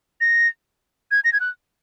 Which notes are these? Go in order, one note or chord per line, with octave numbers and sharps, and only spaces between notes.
A#6
G#6
A#6
G#6
F#6